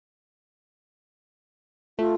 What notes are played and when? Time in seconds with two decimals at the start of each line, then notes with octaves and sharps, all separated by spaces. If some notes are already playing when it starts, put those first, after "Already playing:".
1.99 A3 F4